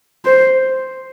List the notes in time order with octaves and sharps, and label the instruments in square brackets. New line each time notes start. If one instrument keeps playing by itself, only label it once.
[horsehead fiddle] C5